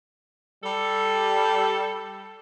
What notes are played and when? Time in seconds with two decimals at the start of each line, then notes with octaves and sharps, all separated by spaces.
0.64 G3 A4